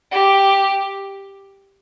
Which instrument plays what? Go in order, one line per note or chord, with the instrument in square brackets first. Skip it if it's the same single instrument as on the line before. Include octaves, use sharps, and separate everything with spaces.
[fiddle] G4